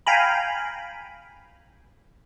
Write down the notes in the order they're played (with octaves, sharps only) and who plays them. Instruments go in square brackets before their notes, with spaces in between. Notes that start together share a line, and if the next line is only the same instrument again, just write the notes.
[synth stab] F5 G5 G#5 A#5 B5